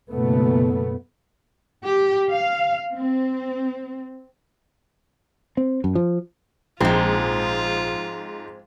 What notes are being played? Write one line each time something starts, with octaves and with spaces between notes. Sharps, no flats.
F#1 B2 A3 B3
G4
F5
C4
C4
F#2
F3
A#1 G#2 F3 G#3 C4 F4